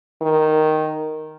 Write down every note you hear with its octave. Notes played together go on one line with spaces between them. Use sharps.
D#3